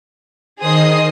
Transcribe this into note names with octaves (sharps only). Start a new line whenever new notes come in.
D#3 G#4 C5 D#5 D#6 C7